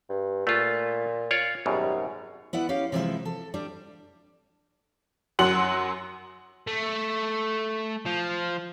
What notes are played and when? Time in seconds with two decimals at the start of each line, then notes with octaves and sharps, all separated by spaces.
0.09 G2
0.47 A#2 A3 F4
1.31 F4 C#5 D5
1.66 G#1 F#2 B2 G3
2.53 B3 E4 D5 F#5
2.69 C#4 G4 F5
2.92 C3 E3 F3 G#3 A#4 E5
3.25 A4
3.54 G3 D4
5.39 F#2 F#3 F#5 C6 F#7
6.67 A3
8.06 F3